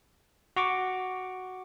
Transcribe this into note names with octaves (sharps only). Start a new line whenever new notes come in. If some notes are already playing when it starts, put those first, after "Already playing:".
F#4 C#6 D6